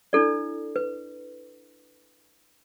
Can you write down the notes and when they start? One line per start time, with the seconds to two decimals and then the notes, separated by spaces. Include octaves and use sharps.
0.13 D4 E4 A4 D5
0.76 B4